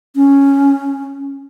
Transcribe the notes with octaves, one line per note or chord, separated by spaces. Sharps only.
C#4